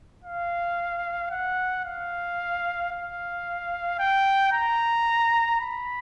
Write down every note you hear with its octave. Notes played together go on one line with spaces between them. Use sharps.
F5
F#5
F5
F5
G5
A#5
B5